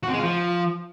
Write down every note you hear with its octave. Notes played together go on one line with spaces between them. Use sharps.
F#4
C4
G#3
F4
F3